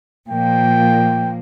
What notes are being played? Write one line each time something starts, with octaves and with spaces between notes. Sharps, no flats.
A#2 F3 A#3 G5